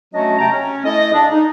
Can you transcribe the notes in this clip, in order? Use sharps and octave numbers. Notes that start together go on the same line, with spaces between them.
F#3 A3 C#4 D4 F#4 D#5
C3 A3 G5 A5 A#5
C#4
A3 E4 A4 D#5
C#3 D4
D#4